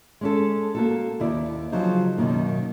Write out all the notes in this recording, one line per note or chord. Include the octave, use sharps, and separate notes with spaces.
G#3 C#4 A4
A#3 F#4 A4
D#2 E4 D5
C#3 F3 F#3 D#4 C5
F#2 B2 D#3 A#3